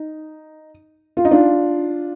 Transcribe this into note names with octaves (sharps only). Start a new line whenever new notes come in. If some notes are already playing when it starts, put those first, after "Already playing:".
Already playing: D#4
F4
D#4
D4 F4